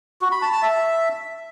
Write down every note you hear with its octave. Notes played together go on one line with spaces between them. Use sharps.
F#4
B5
A5
A5
E5